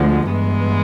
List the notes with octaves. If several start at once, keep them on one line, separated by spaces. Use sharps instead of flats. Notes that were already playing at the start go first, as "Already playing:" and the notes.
Already playing: D2 D3 F3 G#3
G2 E3 G#3 B3